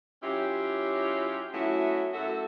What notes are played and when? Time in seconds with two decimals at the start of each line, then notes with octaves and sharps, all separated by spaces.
0.23 F#3 C#4 E4 F4 G4
1.54 F#3 A3 B3 C#4 E4 F#4
2.14 F#2 A3 E4 F#4 A4